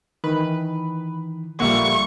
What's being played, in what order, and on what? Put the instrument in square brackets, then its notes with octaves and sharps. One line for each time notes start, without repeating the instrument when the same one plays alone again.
[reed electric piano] D#3 E3 [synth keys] B4
[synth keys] A#1 D3 A#3 [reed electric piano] G3 E5 F#5 [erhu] C#6